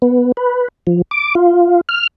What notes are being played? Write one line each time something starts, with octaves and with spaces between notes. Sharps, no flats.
B3
B4
F3
D6
F4
F6